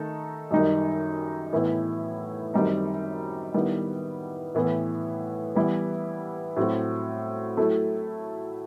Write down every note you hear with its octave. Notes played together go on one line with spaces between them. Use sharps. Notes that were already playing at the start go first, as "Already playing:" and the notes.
Already playing: D#3 A3 D#4 A4
F#2 D#3 G3 D#4
A2 E3 B3 E4
F#2 D#3 G3 C4 D#4
D#3 G3 B3 E4
A2 E3 B3
E3 G3 B3 E4
A2 F#3 C4 F#4
F#3 A3 E4 A4